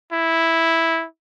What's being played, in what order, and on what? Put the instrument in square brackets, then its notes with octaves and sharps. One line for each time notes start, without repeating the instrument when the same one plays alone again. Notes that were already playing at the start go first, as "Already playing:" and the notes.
[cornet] E4